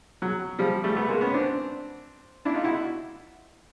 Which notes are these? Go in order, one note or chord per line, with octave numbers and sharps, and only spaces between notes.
F#3
F3 G3
G3 A3
A3 B3
G#3 A#3
B3 C#4
C4 D4
D4 E4
D#4 F4
E4 F#4